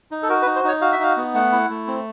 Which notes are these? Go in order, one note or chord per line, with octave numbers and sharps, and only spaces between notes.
D#4
A4
F#4 A#4
B4
D#4
C5
D#4 C#5
F#4 F5
E5
D#4 F5
B3
A3 F#5
E4
A3
C4